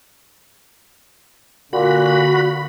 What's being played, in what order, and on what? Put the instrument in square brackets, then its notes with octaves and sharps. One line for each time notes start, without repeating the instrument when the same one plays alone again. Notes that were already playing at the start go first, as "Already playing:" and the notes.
[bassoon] A#2 [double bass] D3 A#3 [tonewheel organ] F#4 B5